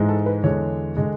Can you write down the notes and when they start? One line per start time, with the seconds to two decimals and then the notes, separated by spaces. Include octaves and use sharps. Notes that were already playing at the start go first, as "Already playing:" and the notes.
Already playing: G#2 E3 G#3
0.09 A4
0.26 B4
0.44 E2 D3 G#3 C#5
0.97 D3 G#3